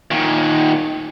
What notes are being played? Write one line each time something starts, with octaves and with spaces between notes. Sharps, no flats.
A#2 D#3